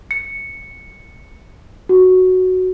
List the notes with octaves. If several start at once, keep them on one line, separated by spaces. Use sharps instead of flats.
C#7
F#4